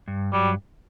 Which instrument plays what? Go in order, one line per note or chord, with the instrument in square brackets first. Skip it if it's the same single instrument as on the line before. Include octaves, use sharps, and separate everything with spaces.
[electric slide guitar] G2
[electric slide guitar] F#3 [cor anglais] G3